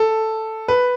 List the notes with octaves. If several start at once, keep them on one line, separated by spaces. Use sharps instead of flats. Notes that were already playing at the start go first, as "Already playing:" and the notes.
Already playing: A4
B4